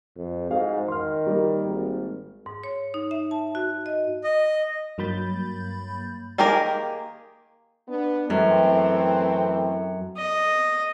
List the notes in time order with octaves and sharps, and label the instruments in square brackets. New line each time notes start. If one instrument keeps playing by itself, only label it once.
[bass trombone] F2
[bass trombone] G#2 [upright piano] F#4 G#4 F5
[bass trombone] D#3 [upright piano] C6 F6
[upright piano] G3 A#3
[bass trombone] G#1
[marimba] G#2
C#5
D#4
E5
A5
F#4
D#5
[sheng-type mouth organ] D#5
[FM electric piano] G2 F#3 A#3 B5 G6 A6
[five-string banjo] D#3 A#3 G4 G#4 A#4
[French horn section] B3 D4
[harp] F#2 [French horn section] E3 A3 C4
[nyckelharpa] D#5